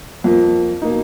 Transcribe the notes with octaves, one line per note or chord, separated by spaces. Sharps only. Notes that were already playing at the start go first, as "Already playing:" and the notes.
F2 F3 A#3
B2 A#3 D#4